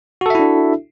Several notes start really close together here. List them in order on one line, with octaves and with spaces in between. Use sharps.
F#4 A4 E5 E4 D4